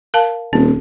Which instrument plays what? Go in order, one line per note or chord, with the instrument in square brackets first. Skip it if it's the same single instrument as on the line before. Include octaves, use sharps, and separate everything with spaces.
[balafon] A#4 F5 A5
[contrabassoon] D#1 [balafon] C4